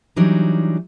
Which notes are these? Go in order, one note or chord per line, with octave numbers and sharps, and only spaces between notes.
E3 F#3 G3 D4 D#4